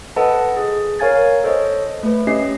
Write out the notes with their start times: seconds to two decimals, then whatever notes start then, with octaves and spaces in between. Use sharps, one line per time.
0.16 A4 B4 D#5 F#5 A5
0.57 G#4
0.99 A#4 C#5 F5 G#5 G#6 A6
1.44 A4 C5 C#5 D#5
2.03 A3 B4
2.27 C#4 G4 D#5 C7